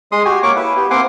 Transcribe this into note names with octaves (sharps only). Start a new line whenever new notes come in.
G#3 C6 D#6
F#4 G4 G#5
A#3 C#5 C#6 D6
E4 B4
B3 G4
A#3 C4 F#5 G#5 C6 D6